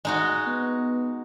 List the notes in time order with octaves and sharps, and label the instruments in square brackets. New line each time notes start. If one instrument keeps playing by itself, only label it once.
[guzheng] G#3 D#4 F#4
[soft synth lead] B3